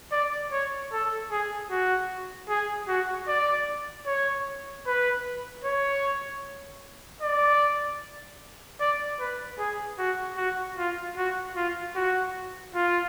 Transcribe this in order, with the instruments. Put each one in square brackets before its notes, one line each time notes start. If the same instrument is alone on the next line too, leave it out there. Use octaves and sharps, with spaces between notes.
[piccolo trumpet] D5
C#5
A4
G#4
F#4
G#4
F#4
D5
C#5
B4
C#5
D5
D5
B4
G#4
F#4
F#4
F4
F#4
F4
F#4
F4